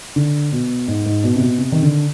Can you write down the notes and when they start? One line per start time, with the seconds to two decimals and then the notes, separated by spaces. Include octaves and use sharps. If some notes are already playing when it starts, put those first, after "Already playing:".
0.16 D3
0.52 B2
0.88 G#2
1.06 G#2
1.24 B2
1.36 C3
1.41 B2
1.58 C3
1.72 D#3
1.83 D3